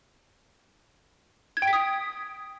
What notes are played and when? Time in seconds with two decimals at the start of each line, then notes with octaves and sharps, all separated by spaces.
1.57 G#6
1.62 G5
1.67 B6
1.73 D#6